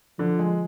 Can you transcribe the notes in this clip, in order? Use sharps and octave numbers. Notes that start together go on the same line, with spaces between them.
D3 F3
G#3